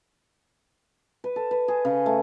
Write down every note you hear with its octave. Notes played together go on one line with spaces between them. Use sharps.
B4
A4
B4
G#4
C#3
A3